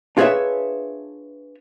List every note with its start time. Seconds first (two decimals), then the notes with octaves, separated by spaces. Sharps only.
0.17 D4 F4 G#4 B4 C#5 E5